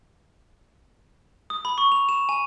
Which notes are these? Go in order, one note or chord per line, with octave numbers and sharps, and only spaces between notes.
D#6
B5
C#6
F7
E7
G#5